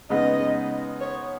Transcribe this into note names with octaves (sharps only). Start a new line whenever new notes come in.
C#3 G#3 B3 D#4 D#5
C#5